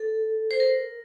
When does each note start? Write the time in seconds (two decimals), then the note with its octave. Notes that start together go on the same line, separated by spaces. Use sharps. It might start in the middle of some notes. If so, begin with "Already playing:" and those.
Already playing: A4
0.51 C5
0.60 A#4